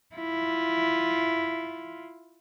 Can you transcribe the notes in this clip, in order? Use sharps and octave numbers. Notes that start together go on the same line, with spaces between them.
E4 F4